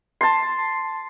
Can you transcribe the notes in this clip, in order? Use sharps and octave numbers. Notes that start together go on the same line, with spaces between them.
A5 C6